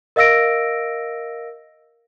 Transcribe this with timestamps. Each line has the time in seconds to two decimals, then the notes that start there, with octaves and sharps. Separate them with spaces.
0.16 A#4 D#5 F5 E6 A#6 D7